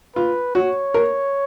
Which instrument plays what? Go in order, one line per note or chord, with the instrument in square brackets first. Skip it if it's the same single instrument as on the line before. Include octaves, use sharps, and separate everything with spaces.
[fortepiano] F4 [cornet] B4
[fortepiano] F#4 [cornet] C#5
[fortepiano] A#4